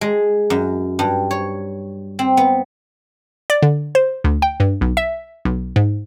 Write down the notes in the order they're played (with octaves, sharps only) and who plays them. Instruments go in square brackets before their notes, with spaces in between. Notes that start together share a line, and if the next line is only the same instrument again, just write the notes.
[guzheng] G#3
F#2
G2
C#5
C4
B3
[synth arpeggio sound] D5
D3
C5
D2
G5
G2
B1
E5
B1
G#2